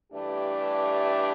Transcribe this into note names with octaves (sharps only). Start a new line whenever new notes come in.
G2 E3 A3 D4 G4